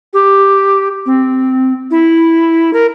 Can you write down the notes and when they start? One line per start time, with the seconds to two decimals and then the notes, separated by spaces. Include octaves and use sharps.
0.14 G4
1.06 C4
1.91 E4
2.73 A#4